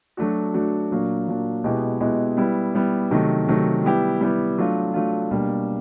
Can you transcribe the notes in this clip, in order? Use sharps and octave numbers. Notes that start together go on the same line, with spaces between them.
F#3 A3 D4 F#4
F#3 A3 D4 F#4
A#2 F#3 A#3 D4
A#2 F#3 A#3 D4
B2 G#3 B3 E4 G4
B2 G#3 B3 E4 G4
G3 B3 E4
G3 B3 E4
C3 D#3 F#3 A3
C3 D#3 F#3 A3
G3 B3 E4 G4
G3 B3 E4 G4
F#3 A3 D4 F4
F#3 A3 D4 F4
B2 G3 A#3 D4